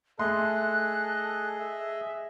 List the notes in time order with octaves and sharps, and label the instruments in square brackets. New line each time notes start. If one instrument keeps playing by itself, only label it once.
[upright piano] A3 C6 [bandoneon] G#4 D#5 [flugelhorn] A4 [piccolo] F#6
[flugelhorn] E5